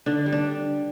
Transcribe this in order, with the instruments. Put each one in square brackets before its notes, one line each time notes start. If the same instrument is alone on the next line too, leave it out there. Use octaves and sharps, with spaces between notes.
[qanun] D3 D4
G3
D4